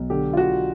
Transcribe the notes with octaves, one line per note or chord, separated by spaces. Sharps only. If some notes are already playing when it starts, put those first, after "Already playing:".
Already playing: B1
D3 G4
F4
D3 F#4